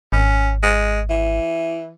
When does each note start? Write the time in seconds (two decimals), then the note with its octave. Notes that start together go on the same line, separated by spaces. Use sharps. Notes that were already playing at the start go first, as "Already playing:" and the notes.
0.12 G#1 C#4
0.63 G#3
1.10 E3